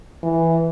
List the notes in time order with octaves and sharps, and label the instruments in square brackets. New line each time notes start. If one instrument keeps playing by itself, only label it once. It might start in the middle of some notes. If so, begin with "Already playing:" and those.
[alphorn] E3